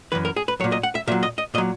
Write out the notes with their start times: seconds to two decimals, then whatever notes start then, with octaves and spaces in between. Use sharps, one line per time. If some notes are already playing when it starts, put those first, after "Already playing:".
0.12 F#2 E3 B4
0.25 A#4
0.36 G#4
0.48 B4
0.60 F#3 C#5
0.64 A#2
0.72 D#5
0.83 F#5
0.95 E5
1.07 A#2 E5
1.12 F#3
1.23 D#5
1.38 D#5
1.54 A#2 D#5
1.58 F#3